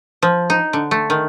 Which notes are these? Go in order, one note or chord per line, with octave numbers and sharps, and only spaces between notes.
F3
D#4
D3
A3
D#3